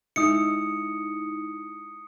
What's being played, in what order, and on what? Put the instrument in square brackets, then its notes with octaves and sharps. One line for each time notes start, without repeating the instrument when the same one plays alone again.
[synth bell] G#3 D#4 E4 [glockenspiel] D#6 C#7